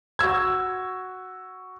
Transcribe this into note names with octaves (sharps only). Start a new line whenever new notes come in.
F#4 E6 G#6